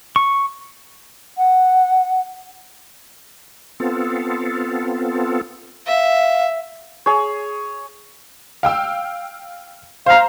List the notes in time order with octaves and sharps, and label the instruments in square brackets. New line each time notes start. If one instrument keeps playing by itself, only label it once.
[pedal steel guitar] C#6
[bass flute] F#5
[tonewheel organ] B3 C4 F4 A4
[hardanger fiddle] E5 [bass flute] F5
[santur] G#4 C#5
[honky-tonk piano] F5 G5 E6
[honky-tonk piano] C5 A#5 [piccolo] F5